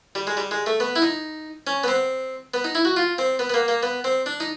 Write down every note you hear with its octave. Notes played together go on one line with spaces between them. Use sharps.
G3
G#3
G3
G#3
A3
B3
E4
D#4
C#4
B3
C4
B3
D#4
E4
F#4
F4
C4
B3
B3
A#3
A#3
B3
C4
D4
D#4